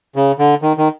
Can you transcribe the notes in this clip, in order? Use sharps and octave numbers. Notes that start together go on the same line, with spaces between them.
C#3
D3
D#3
D#3